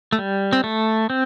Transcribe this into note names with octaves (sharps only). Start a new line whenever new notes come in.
A3
G3
C4
A3
C4